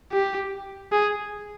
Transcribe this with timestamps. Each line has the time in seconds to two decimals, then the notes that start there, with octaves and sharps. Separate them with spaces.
0.12 G4
0.92 G#4